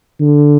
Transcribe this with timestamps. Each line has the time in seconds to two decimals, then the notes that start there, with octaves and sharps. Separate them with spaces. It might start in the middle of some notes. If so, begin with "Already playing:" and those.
0.20 D3